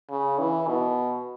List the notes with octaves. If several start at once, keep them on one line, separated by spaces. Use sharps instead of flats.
C#3
E3
B2